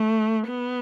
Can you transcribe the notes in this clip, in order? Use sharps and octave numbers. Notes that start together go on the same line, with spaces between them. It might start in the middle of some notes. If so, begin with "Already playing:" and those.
Already playing: A3
B3